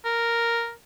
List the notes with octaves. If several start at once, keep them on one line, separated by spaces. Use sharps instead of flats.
A#4